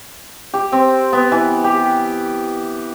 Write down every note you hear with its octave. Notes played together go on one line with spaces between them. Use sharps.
G4
C4
B3
E3
G4